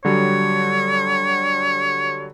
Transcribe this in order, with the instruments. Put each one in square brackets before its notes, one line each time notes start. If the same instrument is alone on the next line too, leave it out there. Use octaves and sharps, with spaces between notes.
[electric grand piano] D3 F#3 G3 [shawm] C#5